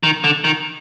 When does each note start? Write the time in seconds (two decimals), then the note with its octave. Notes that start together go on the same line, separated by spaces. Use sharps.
0.03 D#3
0.24 D3
0.44 D#3